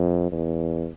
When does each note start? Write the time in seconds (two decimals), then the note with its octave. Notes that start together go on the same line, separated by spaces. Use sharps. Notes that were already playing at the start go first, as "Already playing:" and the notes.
Already playing: F2
0.32 E2